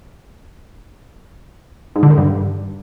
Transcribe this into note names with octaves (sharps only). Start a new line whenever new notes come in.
G#2
D3
D#3
G2